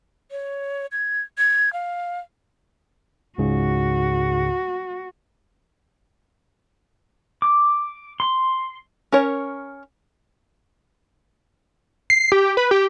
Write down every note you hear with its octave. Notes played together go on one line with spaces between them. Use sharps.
C#5
G#6
G#6
F5
C#2 G#2 C#3 F#4
D6
C6
C#4 A#4 C#5
C7
G4
B4
G4